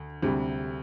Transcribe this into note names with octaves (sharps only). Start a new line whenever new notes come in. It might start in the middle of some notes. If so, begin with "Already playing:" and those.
Already playing: D2
D2 C3 G3